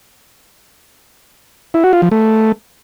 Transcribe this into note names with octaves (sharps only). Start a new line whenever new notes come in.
E4
F#4
F4
F3
A3